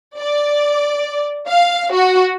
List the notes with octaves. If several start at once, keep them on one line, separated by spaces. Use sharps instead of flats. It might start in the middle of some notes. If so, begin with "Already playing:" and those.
D5
F5
F#4